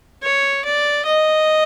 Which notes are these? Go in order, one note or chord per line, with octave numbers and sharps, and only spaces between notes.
C#5
D5
D#5